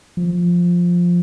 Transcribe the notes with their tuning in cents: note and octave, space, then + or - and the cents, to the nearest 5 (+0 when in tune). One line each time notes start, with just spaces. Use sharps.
F3 +5